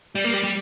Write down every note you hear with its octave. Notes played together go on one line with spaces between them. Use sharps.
G3
A#3
G3
G3